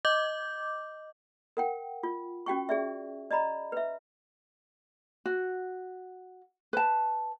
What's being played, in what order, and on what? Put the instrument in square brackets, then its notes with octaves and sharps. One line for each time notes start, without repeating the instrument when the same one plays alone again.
[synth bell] D#5 D6 G6
[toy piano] A#4 F#5 G5
F4
C#4 F#4 G5 C#6
G#4 D5 E5
D5 D#5 A#5 B5
B4 E5
[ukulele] F#4
B4 A5